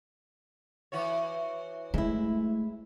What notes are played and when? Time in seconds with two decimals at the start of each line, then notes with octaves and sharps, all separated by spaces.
0.92 E3 F#4 C#5
1.94 G#3 A3 E4